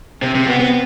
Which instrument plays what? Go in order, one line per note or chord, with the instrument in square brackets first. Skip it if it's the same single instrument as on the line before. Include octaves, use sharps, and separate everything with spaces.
[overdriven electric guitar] C3 [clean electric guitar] C4
[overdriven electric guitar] C3
B3
B3